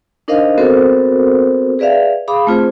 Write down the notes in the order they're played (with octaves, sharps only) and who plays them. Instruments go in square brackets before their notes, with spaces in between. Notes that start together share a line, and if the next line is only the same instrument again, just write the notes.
[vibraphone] D4 D#4 A#4 C5 D#5 F5
B3 C4 F#4 A4 A#4 C5
G#4 B4 D5 E5 F5
G#4 F5 B5 D6 D#6
A3 C4 F4 G#4 C5